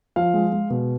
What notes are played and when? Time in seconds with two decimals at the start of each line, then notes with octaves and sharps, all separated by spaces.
0.16 F3 F5
0.34 G#3
0.52 G#3
0.70 B2